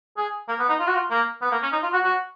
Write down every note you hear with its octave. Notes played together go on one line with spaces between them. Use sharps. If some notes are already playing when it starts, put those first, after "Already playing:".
G#4
A#3
B3
D#4
F4
F#4
F4
A#3
B3
A#3
C#4
D#4
F4
F#4
F#4